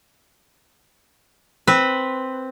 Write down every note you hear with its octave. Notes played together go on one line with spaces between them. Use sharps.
C4 B4